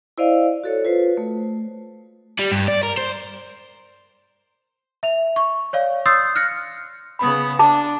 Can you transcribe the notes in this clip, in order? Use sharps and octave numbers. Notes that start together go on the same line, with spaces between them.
E4 C5 D5 D#5 F5
F#4 A4 C#5
F4 B4 C5
A3
G3
G2
D5
A#4
C5
E5 F7
C#6
C#5 D5 F5
C6 D#6 E6 G6 A6 C7
F6 F#6 A#6 C#7
C#3 B3 B5 D#6
D4 A5 D6